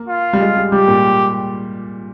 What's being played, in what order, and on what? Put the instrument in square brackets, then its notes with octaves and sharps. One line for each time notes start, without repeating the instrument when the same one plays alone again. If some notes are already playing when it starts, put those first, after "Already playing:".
Already playing: [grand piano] A#3
[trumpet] F4
[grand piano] G3
G#3
G3
[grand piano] G3 [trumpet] G4
[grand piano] A#2